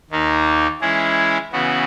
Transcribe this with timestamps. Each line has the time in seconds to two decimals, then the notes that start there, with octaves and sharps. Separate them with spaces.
0.10 D#2 D#3 A#3 D#4
0.81 E3 G#3 C#4 E4 G#4
1.53 C#3 E3 B3 F#4